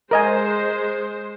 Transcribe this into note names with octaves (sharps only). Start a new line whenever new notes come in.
G#3 A#4 C5 D#5 G#5